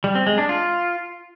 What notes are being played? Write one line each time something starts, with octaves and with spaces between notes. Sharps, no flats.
G3
C4
G#3
D4
F4